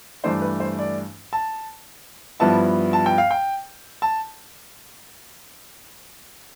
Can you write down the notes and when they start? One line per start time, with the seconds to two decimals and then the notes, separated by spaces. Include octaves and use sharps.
0.24 G2 E3 A3 D4 C5
0.42 B4
0.60 C5
0.79 D5
1.33 A5
2.40 G2 F3 B3 E4 A5
2.93 A5
3.06 G5
3.18 F5
3.31 G5
4.02 A5